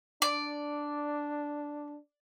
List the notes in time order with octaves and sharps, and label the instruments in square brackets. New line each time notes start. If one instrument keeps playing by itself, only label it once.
[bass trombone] D4 [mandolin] D5